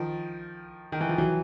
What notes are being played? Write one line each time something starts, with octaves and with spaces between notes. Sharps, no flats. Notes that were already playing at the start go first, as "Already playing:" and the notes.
Already playing: D#3 F3
D#3
E3
F3
E3 F#3